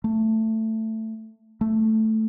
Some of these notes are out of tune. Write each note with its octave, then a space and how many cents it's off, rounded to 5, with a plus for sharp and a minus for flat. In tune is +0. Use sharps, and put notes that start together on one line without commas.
A3 +10
A3 +0